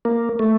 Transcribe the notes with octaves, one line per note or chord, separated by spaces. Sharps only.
A#3
A3